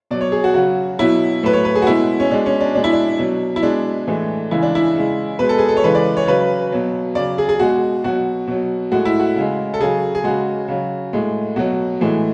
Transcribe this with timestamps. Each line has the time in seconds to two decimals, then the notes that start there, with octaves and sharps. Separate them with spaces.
0.11 B2 F#3 D5
0.21 C#5
0.32 G#4
0.44 F#4
0.54 C#3 F#3 F#4
0.99 B2 F#3 E4
1.43 A2 F#3 B4
1.53 C#5
1.65 B4
1.75 G#4
1.82 F#4
1.87 B2 G#3 E4
2.20 C#4
2.31 B2 G#3 D4
2.46 C#4
2.61 D4
2.75 B2 G#3 D4
2.84 E4
2.93 D4
3.19 B2 F#3
3.56 E4
3.63 B2 G#3 D4
4.07 A2 E3 G#3
4.51 C#3 E3 G#3 E4
4.63 D4
4.75 E4
4.96 C#3 G#3
5.39 B2 G#3 B4
5.49 A4
5.58 G#4
5.68 A4
5.77 C#5
5.84 C#3 E3 G#3 B4
5.95 D5
6.17 C#5
6.27 C#3 F#3 B4
6.72 B2 F#3
7.15 C#3 F#3 D5
7.38 G#4
7.49 G#4
7.59 B2 G#3 F#4
8.04 B2 F#3 F#4
8.47 B2 F#3
8.92 A2 G#3 F#4
9.05 E4
9.19 F#4
9.36 C#3 G#3
9.74 A4
9.80 C#3 F#3 G#4
10.15 G#4
10.24 C#3 G#3 F#4
10.68 C#3 F#3
11.13 A2 G#3
11.56 B2 F#3 F#4
12.01 A2 E3 G#3